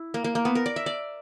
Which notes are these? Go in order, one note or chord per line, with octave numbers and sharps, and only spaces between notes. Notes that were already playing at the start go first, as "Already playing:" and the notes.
Already playing: E4
A#3
A#3
A#3
B3
A#4
D5
E5
D5